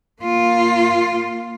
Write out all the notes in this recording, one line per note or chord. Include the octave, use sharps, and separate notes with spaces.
A#3 F4